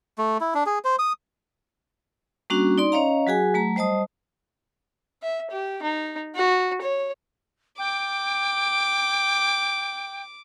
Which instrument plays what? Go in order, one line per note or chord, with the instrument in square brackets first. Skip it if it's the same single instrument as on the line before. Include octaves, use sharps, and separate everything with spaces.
[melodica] A3
E4
D4
G#4
C5
D#6
[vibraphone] G3 A#3 C#4 D4 F#4
D#4 D5 C6
C#4 C#5 D#5 F5 A#5
F#3 F#4 G#4 G#5
F#3 A3 A#5
G3 C5 D#5 A5 D#6
[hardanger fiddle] E5
G4
D#4
F#4
C#5
[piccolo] G5 [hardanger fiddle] D6